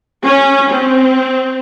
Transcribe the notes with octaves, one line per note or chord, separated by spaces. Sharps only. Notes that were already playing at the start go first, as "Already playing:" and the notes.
C#4
C4